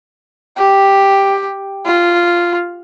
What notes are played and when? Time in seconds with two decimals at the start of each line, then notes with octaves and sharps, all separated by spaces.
0.57 G4
1.86 F4